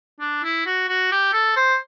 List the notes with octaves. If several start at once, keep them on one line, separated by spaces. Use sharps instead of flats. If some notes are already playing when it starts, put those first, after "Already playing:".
D4
E4
F#4
F#4
G4
A4
C5